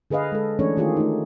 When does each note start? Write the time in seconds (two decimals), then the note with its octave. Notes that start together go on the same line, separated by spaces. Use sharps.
0.10 D3 G#4 B4 D#5 F5
0.32 G#3 A4
0.59 E3 A3 C#4 D4 G#4 C#5
0.77 D#3 A3 F4 G4 G#4
0.97 A3 D#4